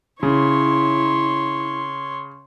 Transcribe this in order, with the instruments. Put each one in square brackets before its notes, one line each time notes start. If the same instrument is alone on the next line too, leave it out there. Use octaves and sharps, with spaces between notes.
[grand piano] C#3 [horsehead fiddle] E4 [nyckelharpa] C#5 C6